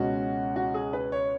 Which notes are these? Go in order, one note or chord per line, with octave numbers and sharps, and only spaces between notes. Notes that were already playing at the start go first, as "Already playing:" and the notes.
Already playing: C#2 B2 G#3 C#4 F#4
F#4
G#4
B4
C#5